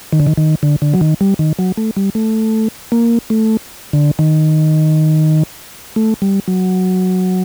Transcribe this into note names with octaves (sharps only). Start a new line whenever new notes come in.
D#3
D3
D#3
D#3
D3
D3
F#3
D#3
G3
D#3
F#3
A3
G3
A3
A#3
A3
D3
D#3
A3
G3
F#3